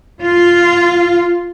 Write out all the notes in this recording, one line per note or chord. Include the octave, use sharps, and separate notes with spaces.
F4